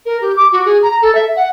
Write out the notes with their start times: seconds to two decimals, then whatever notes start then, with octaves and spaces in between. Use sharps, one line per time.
0.05 A#4
0.21 G4
0.36 D6
0.52 F#4
0.65 G#4
0.82 A#5
1.02 A4
1.15 E5
1.36 F#5